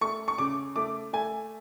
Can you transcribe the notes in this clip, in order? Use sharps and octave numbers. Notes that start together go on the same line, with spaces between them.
A3 C#6
C#6
C#3 D6
A3 D6
A3 G#5